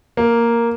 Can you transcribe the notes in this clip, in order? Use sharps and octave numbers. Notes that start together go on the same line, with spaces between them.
A#3